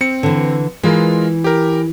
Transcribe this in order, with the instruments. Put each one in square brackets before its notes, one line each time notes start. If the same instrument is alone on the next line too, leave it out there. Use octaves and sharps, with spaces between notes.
[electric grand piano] C4 C#7
[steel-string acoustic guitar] D3 E3
[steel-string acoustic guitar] E3 [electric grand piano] G#3 F4 A#4
[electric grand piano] G4 A#4